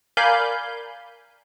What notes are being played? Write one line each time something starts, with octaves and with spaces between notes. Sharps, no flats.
A#4 D5 F5 G#5 B5 G6